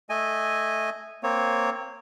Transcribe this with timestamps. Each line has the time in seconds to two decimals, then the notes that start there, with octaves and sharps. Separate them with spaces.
0.10 A3 D#5 G#5
1.23 A#3 C4 C#5